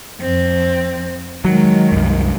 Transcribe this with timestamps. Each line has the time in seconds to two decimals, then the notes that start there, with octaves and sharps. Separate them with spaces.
0.21 F2 C4
1.45 D#3 F#3 G#3
1.92 C2 F#2